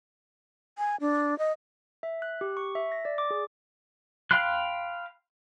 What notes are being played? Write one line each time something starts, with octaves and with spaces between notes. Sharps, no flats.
G#5
D4
D#5
E5
F#6
G4
C#6
E5
A#6
D5
D6
G#4
F5 G5 B5 C6 F#6